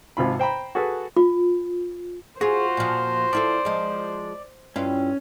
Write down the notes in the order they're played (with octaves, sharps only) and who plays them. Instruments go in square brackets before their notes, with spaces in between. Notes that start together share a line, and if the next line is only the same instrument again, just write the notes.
[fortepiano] G#1 C3 F4 B5
C5 G5 A#5 B5
F#4 G#4 A4 B4
[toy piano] F4
[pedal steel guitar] F4 F#4 [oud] G#4 [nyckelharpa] C5
[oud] A#2 F3
[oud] F3 E4 A4 [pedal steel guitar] D5
[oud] F3 G#3
[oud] G2 E4 F4 [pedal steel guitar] C#4